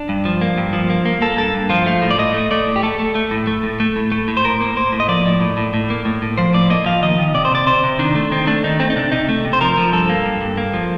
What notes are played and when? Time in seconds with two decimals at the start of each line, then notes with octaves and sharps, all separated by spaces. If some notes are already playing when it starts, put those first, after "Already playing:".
Already playing: D4
0.09 G2
0.25 F3
0.41 A#3
0.58 G2
0.73 F3
0.90 A#3
1.05 A#3
1.22 A#3 A4
1.37 G2 A4
1.54 G2
1.70 F3 F4
1.86 A3 F4
2.02 A2
2.11 D5
2.18 A2 D#5
2.34 A3
2.51 A3 D5
2.67 A2
2.76 G4
2.83 A3 A4
2.99 A3
3.15 A3
3.31 A2
3.47 A3
3.63 A2
3.80 A3
3.96 A2
4.12 A3
4.28 A2
4.37 C5
4.44 A2 A#4
4.61 A#3
4.77 A#3 C5
4.92 A2
5.00 D#5
5.08 F3 D5
5.26 A2
5.41 A2
5.57 A2
5.74 A2
5.90 A#3
6.05 A2
6.22 A2
6.38 F3 C5
6.53 A2 D5
6.70 A#3 D#5
6.86 F3 F5
7.02 D#3 D#5
7.19 D#3
7.34 C3 D5
7.45 C5
7.51 C3 D5
7.66 C3 C5
7.84 C3
7.99 D#3 D4
8.15 A3
8.31 D#3 C4
8.47 A3 D4
8.64 D#3 D#4
8.80 A3 C4
8.90 D#4
8.96 C3 D4
9.12 C3 D#4
9.29 A3
9.45 C3
9.53 C5
9.61 F3 A#4
9.77 F3
9.92 G2 A4
10.09 A#3
10.26 G2
10.41 G2
10.57 A#3
10.74 F3